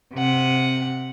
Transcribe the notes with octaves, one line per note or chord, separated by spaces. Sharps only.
C3 F#5